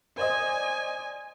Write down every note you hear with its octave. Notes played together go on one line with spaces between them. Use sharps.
C5 D5 D#5 G#5